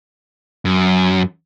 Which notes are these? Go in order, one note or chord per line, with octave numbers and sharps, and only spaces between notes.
F#2